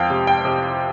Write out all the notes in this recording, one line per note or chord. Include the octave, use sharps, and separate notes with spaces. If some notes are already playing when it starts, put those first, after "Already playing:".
Already playing: F2 F5 G5
C3
G5
C3